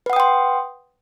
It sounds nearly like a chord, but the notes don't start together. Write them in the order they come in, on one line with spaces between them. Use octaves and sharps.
B4 F#5 D#6 G5 C6